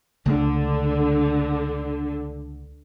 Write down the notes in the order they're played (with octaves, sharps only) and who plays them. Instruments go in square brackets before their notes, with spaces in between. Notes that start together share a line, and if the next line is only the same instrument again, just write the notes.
[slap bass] C#2 A3 [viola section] D3